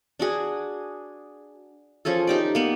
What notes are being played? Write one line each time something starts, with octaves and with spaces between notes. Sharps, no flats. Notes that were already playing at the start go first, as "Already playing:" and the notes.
D4 F#4 G#4
F3 C#4 G#4 A4
D#4 G4 D5
A#3 B3